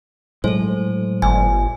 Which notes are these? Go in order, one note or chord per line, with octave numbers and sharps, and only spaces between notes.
A2 F#3 G#3 A4 C5
G1 G#5